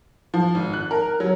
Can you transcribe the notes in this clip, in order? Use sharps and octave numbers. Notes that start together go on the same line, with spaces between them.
F3
G#1
F#6
A#4
F#3